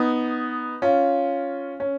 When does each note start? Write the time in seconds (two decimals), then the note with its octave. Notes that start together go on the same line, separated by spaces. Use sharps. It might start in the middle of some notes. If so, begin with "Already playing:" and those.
Already playing: B3 D#4
0.82 C#4 F4
1.80 C#4